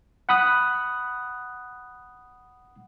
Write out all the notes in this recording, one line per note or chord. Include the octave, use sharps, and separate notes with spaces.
F#5 B5 D#6 F#6